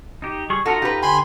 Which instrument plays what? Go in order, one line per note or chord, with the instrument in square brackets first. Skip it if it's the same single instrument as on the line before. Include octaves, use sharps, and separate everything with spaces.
[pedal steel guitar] D#4 G4
G3 G#4 C#6
[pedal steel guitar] D#4 F4 A#5 [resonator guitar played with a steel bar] F#4 A4
[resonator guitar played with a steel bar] G4 B4
[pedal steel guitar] D3 [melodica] G#5 B5 C6